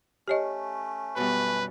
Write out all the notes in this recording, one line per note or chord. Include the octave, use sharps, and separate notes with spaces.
A3 C#4 G4 C#5 D#5
F#2 B2 G3 B4